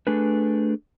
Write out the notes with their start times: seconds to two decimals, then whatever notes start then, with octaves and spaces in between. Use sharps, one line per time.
0.07 A3 D4 G#4 A4 B4